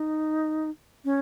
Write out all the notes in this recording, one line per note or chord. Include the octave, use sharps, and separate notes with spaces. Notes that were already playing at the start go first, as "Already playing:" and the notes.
Already playing: D#4
C#4